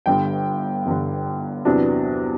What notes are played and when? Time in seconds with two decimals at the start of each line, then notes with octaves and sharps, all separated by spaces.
0.06 G1 G2 D3 G5
0.86 G1 G2 D3
1.65 E2 C3 F#3 B3 D4